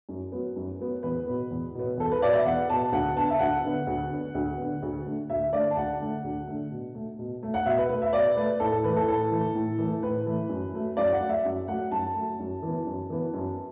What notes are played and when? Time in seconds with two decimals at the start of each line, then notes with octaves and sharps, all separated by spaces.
0.09 F#2
0.32 F#3 B3
0.56 F#2
0.80 F#3 B3
1.03 E2 B4
1.27 B2 B3
1.51 E2
1.75 B2 B3
1.97 E2 A4
2.12 B4
2.21 B2 B3 D5
2.34 E5
2.45 E2 F#5
2.69 B2 B3 A5
2.92 D2 F#5
3.16 D3 B3 A5
3.30 E5
3.39 D2 F#5
3.64 D3 B3
3.87 D2
4.10 D3 B3
4.35 D2
4.58 D3 B3
4.83 D2
5.06 D3 A3
5.30 D2 E5
5.52 D3 A3 D5
5.71 A5
5.76 D2 F#5
6.00 D3 A3
6.24 D2
6.47 D3 A3
6.71 B2
6.95 A3
7.19 B2
7.43 A3
7.54 F#5
7.66 B2 E5
7.78 B4
7.89 A3 B4
8.02 E5
8.13 B2 D5
8.37 A3 B4
8.60 A2 A4
8.72 A4
8.84 E3 A3 B4
8.96 A4
9.08 A2 A4
9.32 E3 A3
9.55 A2
9.78 E3 A3
10.03 A2 B4
10.26 E3 A3
10.49 F#2
10.73 F#3 A3
10.97 F#2 D5
11.13 F#5
11.20 F#3 A3
11.29 E5
11.45 F#2
11.68 F#3 A3 F#5
11.91 F#2 A5
12.15 F#3 A3
12.39 F#2
12.63 E3 B3
12.86 F#2
13.10 E3 B3
13.34 F#2